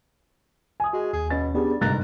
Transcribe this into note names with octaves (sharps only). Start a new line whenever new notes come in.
G#5 D#6
G#3 F#4
D#2 G#4
B2 C#4 A6
G3 B3 D4 G4 G#4
G1 G#2 C3 A#4 F#6 A6